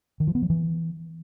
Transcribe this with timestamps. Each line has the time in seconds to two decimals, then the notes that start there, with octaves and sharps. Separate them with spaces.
0.20 D#3
0.27 F3
0.35 B3
0.42 F3
0.50 E3